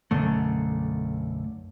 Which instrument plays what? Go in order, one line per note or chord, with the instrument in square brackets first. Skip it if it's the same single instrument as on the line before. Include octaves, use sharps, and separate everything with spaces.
[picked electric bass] B1 F#2 D3 A3